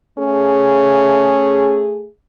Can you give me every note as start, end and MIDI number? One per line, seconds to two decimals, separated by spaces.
0.18 2.07 57
0.18 1.82 61
0.18 2.07 68